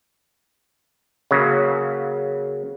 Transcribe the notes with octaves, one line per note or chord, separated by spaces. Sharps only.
C#3 F#3 A#3